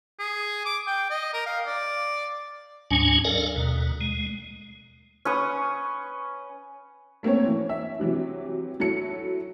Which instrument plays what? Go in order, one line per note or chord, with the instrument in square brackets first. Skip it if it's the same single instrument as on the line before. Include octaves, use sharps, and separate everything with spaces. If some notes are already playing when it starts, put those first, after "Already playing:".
[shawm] G#4
D6
G5
D#5
A#4
F5
D5
[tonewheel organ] D2 G#2 F#3 C#4 D4 G#5
A4 A#4 D5 D#5 F5
D#2 B2
G#3
[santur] C#4 B4 C#6 D#6
[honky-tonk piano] A3 A#3 C4 C#4 C#5
E3
E5
C3 E3 F#3
F#3 E4 A4 C#7